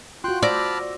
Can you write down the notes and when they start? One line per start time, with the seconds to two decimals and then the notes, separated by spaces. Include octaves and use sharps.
0.24 F4 F#4 G5 C6 F#6
0.43 C5 D5 A5 B5 D6 E6 F6 A#6